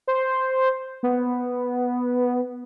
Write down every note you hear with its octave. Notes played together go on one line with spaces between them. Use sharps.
C5
B3